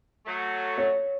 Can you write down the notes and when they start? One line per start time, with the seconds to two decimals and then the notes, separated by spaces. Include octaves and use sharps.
0.26 F#3 A3
0.78 C#5